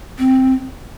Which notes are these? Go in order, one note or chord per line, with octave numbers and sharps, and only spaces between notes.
C4